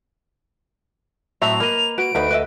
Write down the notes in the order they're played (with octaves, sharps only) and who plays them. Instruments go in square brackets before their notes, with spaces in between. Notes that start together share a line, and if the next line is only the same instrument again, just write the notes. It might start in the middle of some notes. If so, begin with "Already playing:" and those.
[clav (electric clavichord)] A2 F#3 C4 [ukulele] E5 [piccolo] F7
[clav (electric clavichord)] A#3 D#5 [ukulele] A#4 B4
[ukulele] F#4 B4 [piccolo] D7
[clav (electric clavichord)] D2 [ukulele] D#4 B4 B5
[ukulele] B4 D#5 E5